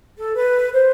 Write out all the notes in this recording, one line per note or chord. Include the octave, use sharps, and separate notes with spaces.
A4
B4
C5